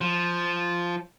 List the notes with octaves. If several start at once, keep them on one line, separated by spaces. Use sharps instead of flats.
F3